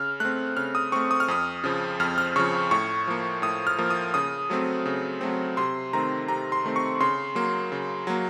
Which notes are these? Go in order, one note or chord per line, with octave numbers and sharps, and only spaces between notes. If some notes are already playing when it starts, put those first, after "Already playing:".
Already playing: C#3 F6
A3 C4 F#6
C#3 F6
D#6
A3 C4 C#6
D#6
F6
F2 D#6
C#3 F3
F2 F6
F6
C#3 F3 C#6
A2 C#6
F3 A#3
A2 D#6
F6
F3 A#3
D#6
C#3 D#6
F#3 A3 C4
C#3
F#3 A3 C4
C3 C6
D#3 A3 C4 A#5
C3 A#5
C6
D#3 A3 C4
C#6
C#3 C6
F#3 A#3
C#3
F#3 A#3